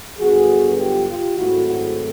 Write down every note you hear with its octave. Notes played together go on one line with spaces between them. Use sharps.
G2 D3 F#3 B3 F#4 G#4
F4 G4
F4 G4
G#2 D#3 F#3 A3 C4 E4 F#4
E4 F#4